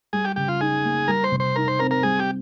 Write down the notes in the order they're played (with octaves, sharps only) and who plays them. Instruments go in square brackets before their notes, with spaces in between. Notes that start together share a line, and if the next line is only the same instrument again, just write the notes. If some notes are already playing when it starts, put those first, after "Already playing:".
[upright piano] G3 [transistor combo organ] G#4
[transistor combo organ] G4
[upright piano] C#3 [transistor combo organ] G4
[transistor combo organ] F4
[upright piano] D#4 [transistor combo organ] G#4
[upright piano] A#3
[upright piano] G3 [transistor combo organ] A#4
[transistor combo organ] C5
[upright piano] C3
[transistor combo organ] C5
[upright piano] D#4 [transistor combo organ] A#4
[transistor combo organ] C5
[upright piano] C4 [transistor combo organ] A#4
[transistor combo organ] A#4
[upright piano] G3 [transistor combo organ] G#4
[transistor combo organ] G4